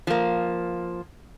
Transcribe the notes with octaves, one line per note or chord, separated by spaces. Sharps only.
F3 A#3